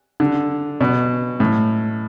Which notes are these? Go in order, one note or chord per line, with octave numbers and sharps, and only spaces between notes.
D3
B2
A2